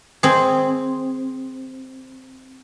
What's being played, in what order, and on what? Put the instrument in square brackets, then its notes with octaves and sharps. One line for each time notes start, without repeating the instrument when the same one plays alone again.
[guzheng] C4 G#4